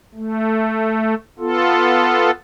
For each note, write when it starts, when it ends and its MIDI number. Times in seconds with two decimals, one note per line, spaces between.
0.15 1.15 57
1.39 2.31 59
1.39 2.31 65
1.39 2.31 69